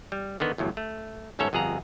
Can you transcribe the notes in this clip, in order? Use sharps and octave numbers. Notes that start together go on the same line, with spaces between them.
G3
D3 D#3 B3
G1 E2 A2 F#3
A3
G1 G#2 C#4 A4 C#5 E5
G1 F2 G#4 F#5 A#5